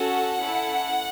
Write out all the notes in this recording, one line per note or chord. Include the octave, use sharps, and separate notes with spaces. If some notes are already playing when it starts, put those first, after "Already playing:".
Already playing: C#4 F#4 A4 F#5
C#4 E4 A4